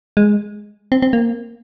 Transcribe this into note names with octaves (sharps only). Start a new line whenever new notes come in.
G#3
C4
C4
A#3